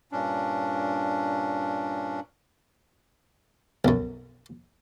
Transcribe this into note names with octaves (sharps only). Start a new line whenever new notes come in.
G2 A#2 C#4 D4
B1 F#2